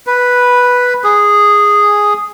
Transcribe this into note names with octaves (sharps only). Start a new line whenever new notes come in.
B4
G#4